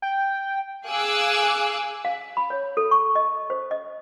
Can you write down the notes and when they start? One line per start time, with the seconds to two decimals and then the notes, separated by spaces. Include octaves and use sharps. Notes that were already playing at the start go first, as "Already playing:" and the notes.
0.02 G5
0.87 G#4 F5 G#5 D6 E6 F#6
2.05 F5
2.37 B5
2.50 C#5
2.77 A4
2.91 C#6
3.15 D#5
3.50 C5
3.71 D#5